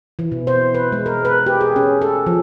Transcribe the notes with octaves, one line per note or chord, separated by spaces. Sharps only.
E3
B2
C5
B4
G#3
A#4
B4
G4
G#4
C#4
A4
F3